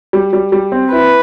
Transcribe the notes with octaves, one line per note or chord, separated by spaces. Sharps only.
G3
G3
G3
C4
E4 B4